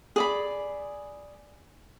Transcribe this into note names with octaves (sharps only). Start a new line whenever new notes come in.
G#4 D5 B5